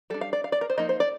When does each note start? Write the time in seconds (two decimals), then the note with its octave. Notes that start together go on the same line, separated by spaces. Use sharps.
0.10 G3 A4
0.14 D4
0.21 F5
0.33 D5
0.44 F5
0.52 D5
0.61 A#4
0.70 C5
0.78 F3 A#3 D#4 D#5
0.89 C5
1.00 D5